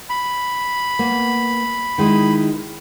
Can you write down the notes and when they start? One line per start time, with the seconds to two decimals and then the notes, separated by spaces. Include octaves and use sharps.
0.10 B5
0.99 A#3 B3
1.98 D#3 G#3 E4